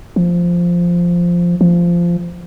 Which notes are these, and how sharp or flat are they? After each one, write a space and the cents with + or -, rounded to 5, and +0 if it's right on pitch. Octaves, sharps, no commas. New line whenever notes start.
F3 -5
F3 -15